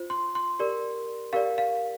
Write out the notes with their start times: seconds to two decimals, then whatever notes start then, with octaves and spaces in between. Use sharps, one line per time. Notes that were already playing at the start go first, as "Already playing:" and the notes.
Already playing: F4 C5
0.10 C6
0.35 C6
0.59 G4 A#4 D5
1.33 G4 A#4 D5 F5
1.58 F5